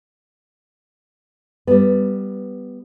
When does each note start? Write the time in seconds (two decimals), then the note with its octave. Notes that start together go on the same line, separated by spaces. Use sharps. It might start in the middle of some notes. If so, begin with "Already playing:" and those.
1.67 G3 B3